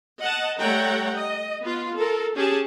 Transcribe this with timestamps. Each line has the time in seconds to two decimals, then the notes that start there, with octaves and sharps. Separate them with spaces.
0.21 D#5 F#5 A5
0.60 G3 A3 C#5 F#5 G5 A#5
1.14 D#5
1.62 B3 F4
1.98 A4 A#4
2.35 C#4 G4 G#4 A5